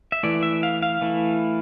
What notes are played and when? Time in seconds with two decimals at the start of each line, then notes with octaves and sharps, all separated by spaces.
0.12 E5
0.23 E3 A3 E4 D5
0.43 E5
0.63 F5
0.83 F5
1.01 E3 A3 E4